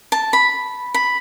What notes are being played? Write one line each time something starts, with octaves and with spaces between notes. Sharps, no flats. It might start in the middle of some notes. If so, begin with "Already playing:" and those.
A5
B5
B5